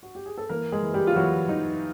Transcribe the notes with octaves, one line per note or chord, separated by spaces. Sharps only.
F#4
G4
G#4
A4
E3 A#3 A#4
G#3 G#4
E3
G3 G4
F4
E3 F#3 F#4
E3 D#4